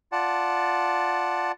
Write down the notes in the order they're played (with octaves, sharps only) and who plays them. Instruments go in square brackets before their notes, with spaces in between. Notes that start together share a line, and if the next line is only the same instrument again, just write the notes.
[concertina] F4 D5 F#5 A5